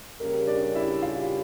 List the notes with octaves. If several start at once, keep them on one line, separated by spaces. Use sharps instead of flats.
C#3 G3 A#3 C#4 G4 A#4
D4 D5
E4 E5
F4 F5